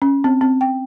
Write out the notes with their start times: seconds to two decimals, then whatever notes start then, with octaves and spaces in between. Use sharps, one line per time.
0.02 C#4
0.24 C4
0.41 C4
0.61 G5